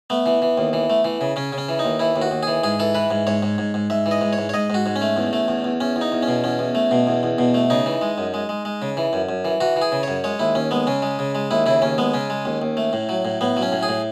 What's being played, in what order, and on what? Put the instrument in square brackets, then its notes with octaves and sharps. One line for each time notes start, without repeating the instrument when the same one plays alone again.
[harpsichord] A3 B3
E3
E3
D#2
E3
A3
E3
C#3
C#3 C#4
C#3
C#4
E3
D#4
D#2
E3 E4
D#2
F#4
D#2
E3 G#4
G#2 G#4
E3 A4
E3 B4
G#2
G#2 C#5
G#2
G#2
G#2
G#2 E5
E3
D#5
G#2
C#5
G#2
C#5
G#2 D#5
G#2 F#4
G#2
C#4
A3
E2
A3
E2
E2
E2 C#4
E2
D#4
E2
C#4
B2
E2 C#4
E2
A3
B2
E2
E2
B2
A3
C#3 D#4
E3
G#3
F#2
G#3
G#3
G#3
C#3
E3
F#2
F#2
E3
E3 F#4
E3
G#4
C#3
F#2 C#5
G#3 C#5
D#2 E4
D#2 C#4
G#3 B3
C#3 C#4
G#3
C#3
G#3
D#2 E4
C#3 E4
D#2 C#4
G#3 B3
C#3 C#4
G#3
D#2
D#2
A3
A2
F#3
A2
A2 B3
F#3
C#4
A2
G#4
A2